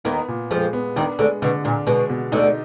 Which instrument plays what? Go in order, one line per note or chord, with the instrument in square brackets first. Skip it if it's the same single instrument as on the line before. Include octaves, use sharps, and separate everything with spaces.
[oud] D#2 D#3 [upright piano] B3
[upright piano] A#2
[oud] F2 F3 [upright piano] G#3
[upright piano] B3
[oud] D#2 D#3 [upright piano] D4
[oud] D2 D3 [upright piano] G#3
[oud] B2 [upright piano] D3
[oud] A#2 [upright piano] D4
[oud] B2 [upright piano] G#3
[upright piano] B2
[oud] D2 D3 [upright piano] D#4